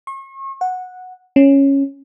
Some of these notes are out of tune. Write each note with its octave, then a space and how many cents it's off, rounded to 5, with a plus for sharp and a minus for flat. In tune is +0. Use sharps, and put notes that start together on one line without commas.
C#6 -40
F#5 -10
C#4 -5